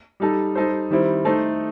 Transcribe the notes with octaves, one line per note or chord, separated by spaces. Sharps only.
G3 D#4 A4
G3 D#4 A4 C5
D#3 G3 C4 E4
A3 D#4 A4 C5